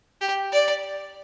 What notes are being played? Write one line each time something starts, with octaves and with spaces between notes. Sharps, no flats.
G4
D5